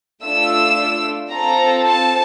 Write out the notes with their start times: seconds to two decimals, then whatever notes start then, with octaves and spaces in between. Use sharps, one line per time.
0.24 A3 D4 F4 E6
1.32 C4 F4 A4 A#5
1.86 A5